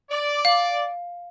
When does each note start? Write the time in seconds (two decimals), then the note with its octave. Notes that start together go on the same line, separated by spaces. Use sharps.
0.10 D5
0.45 F5